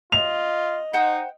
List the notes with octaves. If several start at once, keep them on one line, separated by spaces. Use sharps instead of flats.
F4 D#5 F7
D#4 C5 F#5 G5